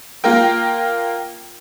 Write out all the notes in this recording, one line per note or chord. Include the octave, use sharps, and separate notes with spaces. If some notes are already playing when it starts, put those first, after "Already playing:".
A#3 F4 A#4 G5